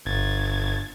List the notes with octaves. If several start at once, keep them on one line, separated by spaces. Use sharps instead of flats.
G1 G#6 A6